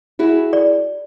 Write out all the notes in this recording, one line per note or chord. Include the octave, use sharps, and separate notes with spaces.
E4 F#4 G#4
D5